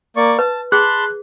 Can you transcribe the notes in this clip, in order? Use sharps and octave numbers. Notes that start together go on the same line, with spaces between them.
A#3 D5 C#6
B4 A5
G#4 A5 B5 C6 F#6